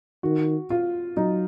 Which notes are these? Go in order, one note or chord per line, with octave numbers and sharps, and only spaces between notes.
D#3 F#4
F4
F#3 D#4